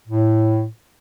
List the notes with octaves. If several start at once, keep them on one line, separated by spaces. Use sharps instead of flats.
A2